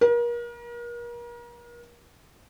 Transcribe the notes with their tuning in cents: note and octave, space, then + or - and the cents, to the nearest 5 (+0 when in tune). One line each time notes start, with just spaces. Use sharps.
A#4 +35